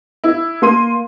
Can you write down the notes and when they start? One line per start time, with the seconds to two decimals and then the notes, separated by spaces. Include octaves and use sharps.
0.24 E4
0.62 A#3 C6 D#7